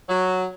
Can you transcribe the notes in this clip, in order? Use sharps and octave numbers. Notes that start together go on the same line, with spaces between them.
F#3